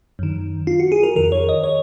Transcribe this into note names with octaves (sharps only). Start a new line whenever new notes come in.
F#2 D#3
F4
F#4
G#4
A#4
F2 D#3 A#4
C#5
D#5
C#5